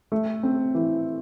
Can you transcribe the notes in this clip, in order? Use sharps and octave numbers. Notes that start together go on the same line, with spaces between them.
A3
C4
E3